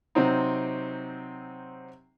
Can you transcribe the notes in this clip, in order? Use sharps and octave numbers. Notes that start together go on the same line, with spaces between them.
C3 F#3 C4 D#4